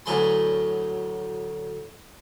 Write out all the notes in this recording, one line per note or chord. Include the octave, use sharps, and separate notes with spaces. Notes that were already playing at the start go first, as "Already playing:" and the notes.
D2 A2 F#3 B4 G#5 C6